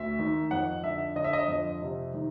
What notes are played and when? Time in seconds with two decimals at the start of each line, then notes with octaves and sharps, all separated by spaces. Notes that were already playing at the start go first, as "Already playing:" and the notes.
Already playing: D2 E5
0.19 D#3
0.51 F2 F#5
0.83 D3 E5
1.16 D3 D#5
1.24 E5
1.33 D#5
1.48 F2
1.82 C3
2.14 D#3